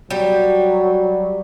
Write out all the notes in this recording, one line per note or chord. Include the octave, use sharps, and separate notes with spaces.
F#3 G3